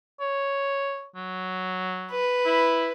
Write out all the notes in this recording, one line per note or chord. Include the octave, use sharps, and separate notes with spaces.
C#5
F#3
B4
E4